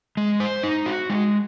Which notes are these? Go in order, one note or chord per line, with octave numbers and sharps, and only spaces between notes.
G#3
C5
D#4
F#4
G#3